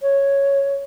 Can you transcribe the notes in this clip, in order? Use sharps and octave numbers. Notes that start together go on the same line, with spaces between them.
C#5